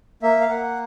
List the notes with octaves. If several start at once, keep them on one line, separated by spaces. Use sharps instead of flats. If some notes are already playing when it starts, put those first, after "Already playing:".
A#3 E5
F5
A#3 F#5